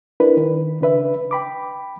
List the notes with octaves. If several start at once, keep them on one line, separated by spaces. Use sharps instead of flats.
D4 E4 A#4 B4
D#3
C#3 D4 B4 E5
G5 B5 D6